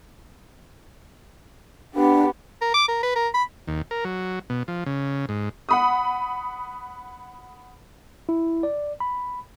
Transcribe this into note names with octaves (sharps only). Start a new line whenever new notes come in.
B3 D4 G4
A#4
D6
A#4
B4
A#4
B5
D#2
A#4
F#3
B2
F3
C#3
G#2
F#5 B5 D#6
E4
D5
B5